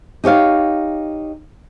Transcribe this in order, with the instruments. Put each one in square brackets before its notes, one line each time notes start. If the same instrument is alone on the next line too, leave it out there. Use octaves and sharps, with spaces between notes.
[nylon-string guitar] D#4 G4 C#5 F5